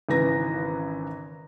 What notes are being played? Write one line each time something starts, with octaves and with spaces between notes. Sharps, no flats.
G#1 C#3 E3 B4 A#5 A#6